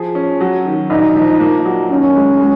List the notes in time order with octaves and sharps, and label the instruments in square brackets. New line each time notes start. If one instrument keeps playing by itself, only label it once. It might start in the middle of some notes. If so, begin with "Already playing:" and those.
Already playing: [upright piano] F3 G#4
C#4
F#3
D#3
[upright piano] A#1 [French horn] D#4
[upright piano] F3
A#3
F#3
[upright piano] D#2 [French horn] C#4
[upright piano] G#3
G#3